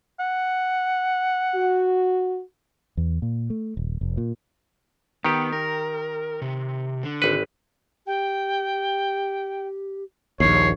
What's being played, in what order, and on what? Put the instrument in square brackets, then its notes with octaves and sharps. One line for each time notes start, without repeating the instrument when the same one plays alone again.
[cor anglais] F#5
[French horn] F#4
[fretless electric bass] E2
A#2
A3
D#1
F1
A#2
[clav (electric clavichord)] D#3 G4 [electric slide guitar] B3
[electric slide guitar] A#4
C3
D3
[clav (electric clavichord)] G#1 B4
[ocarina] G4 [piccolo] G5
[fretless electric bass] A#1 D#2 [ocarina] D4 [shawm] C#5 [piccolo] C7